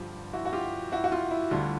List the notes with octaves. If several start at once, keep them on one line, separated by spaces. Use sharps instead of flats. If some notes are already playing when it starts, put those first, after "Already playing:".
Already playing: G2 D3 F3 F4 G4
E4 F#4
F#4
F4 G4
E4 F#4
F#4
F4
E4
D2 D3 G3 F4